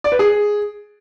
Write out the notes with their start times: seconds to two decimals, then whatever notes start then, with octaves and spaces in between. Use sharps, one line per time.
0.04 D5
0.12 B4
0.19 G#4